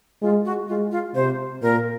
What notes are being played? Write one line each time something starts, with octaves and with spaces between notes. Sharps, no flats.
G#3 F4
F#4
G#3 F4
F4
C3 C5
A#2 A#4